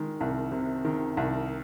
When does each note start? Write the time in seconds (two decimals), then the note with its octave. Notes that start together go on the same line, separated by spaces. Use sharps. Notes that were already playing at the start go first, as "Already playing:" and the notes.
Already playing: D#3 G#3
0.21 C2
0.52 C3
0.85 D#3
1.17 C2